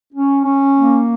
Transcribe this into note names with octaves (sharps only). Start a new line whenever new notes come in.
C#4
C#4
A#3